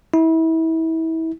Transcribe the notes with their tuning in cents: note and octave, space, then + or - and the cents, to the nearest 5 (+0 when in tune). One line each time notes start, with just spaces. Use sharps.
E4 -30